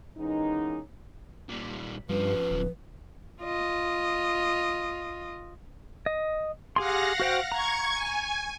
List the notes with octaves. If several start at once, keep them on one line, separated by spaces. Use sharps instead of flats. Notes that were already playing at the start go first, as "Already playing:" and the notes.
E3 G#3 A#3 B3 C#4 D#4
A#2 G3
G2 F3 C#4 B4
D1
F4 D#5
D#5
G4 G#4 F5 F#5 C6 A#6
F#4 C5 G5
A#5 C#6 G#6
G#5